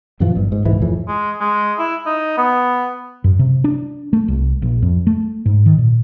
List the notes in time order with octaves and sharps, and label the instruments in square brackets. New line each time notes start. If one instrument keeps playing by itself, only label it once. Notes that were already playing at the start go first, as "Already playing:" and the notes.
[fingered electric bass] F#2 A#2 E3 F3
G1 G2
G#2
D#1 C2 G#2 E3
F2 A2 E3
[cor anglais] G#3
G#3
E4
D#4
B3
[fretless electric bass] F#2
C3
D4
A3
C2
A#1
F2
A3
G#2
D#3
A#2